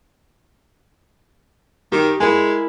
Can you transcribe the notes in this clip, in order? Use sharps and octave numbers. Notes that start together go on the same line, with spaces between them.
D#3 G4
G#3 E4 A#4 G#5